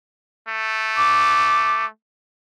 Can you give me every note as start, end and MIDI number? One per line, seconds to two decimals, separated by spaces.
0.48 1.87 57
0.97 1.85 86